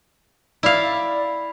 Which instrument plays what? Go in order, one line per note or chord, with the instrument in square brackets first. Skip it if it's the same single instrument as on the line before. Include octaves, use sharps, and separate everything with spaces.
[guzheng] E4 F5 [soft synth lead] D5